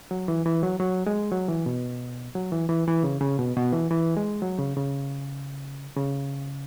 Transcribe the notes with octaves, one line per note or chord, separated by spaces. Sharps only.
F#3
E3
E3
F#3
F#3
G#3
F#3
E3
B2
F#3
E3
E3
E3
C#3
C#3
B2
B2
E3
E3
G#3
F#3
C#3
C#3
C#3